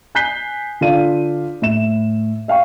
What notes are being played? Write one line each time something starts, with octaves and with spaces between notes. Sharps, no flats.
G#5 F#6 G6 B6 C7 G7
D3 F4 A4 D5 F5 D#7
A2 E5 E7
E5 F5 G5 C#6